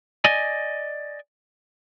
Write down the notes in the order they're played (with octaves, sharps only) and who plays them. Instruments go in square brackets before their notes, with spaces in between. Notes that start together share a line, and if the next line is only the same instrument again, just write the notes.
[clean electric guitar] D5 D#5 G#5